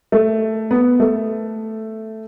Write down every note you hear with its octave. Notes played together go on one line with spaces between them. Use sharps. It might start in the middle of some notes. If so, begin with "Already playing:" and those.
A3
B3
A3